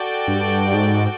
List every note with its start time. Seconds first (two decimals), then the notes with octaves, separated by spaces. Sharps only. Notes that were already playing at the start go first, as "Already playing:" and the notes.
Already playing: F#4 A4 D5 G5
0.28 G2
0.74 G#2